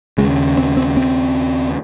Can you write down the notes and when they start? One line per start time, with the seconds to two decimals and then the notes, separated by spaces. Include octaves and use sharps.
0.18 D#2 C#3 G#3
0.57 C4
0.77 C4
0.97 C4